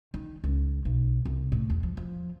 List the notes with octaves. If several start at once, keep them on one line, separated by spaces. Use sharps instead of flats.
D#3
C#2
B1
C2
A2
E2
F3
F3